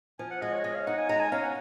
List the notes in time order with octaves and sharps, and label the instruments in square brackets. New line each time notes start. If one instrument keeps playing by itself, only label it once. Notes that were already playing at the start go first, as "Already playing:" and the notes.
[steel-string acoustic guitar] F3 [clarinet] G#5
[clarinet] F#5
[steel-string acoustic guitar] G#3 [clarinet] D#5
[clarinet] C#5
[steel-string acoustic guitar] C#3 [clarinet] D#5
[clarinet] F5
[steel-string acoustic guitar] D#4 [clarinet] F#5
[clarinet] G#5
[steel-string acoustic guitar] G#3 [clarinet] A#5
[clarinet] G#5
[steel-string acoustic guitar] C#4 [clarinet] F5
[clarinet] F#5